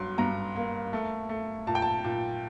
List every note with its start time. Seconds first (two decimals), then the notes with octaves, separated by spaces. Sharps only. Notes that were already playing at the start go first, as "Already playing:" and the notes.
Already playing: G2 F#3 C6
0.18 G2 A#5
0.56 A#3
0.93 A3
1.29 A3
1.67 A#2 A5
1.75 G5
1.82 A5
2.04 A#2